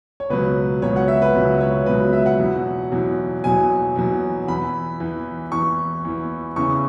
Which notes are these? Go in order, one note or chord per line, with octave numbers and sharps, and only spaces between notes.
C#5
C#2 B2 F#3 B4
C#2 B2 F#3 C#5
F#5
E5
B4
C#2 B2 F#3
C#5
C#2 B2 F#3 B4
E5
F#5
E2 B2 F#3
E2 B2 F#3
E2 B2 F#3 G#5
E2 B2 F#3
E2 E3 B5
E2 E3
E2 E3 C#6
E2 E3
E2 C#3 E3 C#6